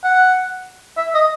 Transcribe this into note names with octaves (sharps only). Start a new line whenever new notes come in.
F#5
E5
D#5